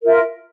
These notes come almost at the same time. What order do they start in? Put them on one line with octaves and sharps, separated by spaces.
A#4 F4 E5